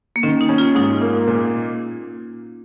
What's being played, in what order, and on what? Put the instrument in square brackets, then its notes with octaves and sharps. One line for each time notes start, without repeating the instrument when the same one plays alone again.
[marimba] A#3
[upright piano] D#3 [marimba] C#4
[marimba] D#4
[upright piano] C#4
[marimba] F4
[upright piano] G#2 [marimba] D#4
[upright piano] A#3
A#2